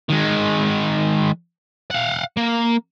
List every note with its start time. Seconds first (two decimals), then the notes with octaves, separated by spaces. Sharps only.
0.10 D#3 G#3
1.91 F5 F#5
2.37 A#3